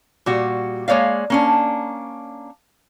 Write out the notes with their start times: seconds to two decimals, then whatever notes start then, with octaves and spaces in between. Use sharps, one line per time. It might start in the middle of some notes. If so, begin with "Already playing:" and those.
0.26 A#2 G3 F#4
0.88 G#3 A#3 C#5 D5 F5
1.30 A#3 C#4 D4